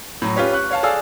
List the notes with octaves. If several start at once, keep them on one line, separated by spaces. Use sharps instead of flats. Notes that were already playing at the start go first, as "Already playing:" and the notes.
A2 F#3
C#4 F4 G4 B4 C#5
C#6 F#6
C#5 F5 A5
G#4 A4 D5 F5 E6